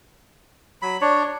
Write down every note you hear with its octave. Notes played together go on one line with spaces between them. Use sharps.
F#3 B5
D4 C#5